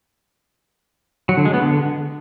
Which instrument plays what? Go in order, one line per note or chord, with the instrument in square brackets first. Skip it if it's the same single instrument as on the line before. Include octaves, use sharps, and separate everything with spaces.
[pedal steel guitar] F#3
D3
G#3
B3
D3